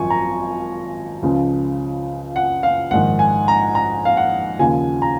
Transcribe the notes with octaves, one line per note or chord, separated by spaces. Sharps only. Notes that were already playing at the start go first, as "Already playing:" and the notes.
Already playing: G#1 F#2 F3 G#5 C#6
A#5
C#2 C#3 F3
F#5
F5
A#1 G#2 D#3 F#5
G#5
A#5
A#5
F5
F#5
D#2 C#3 F3 G#5
A#5